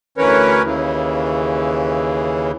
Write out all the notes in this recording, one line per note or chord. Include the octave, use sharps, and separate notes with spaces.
D2 E3 C#4 A#4 B4 C#5
D#2 C#3 E3